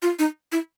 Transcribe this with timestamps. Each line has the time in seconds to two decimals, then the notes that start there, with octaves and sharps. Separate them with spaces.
0.02 F4
0.19 D#4
0.52 E4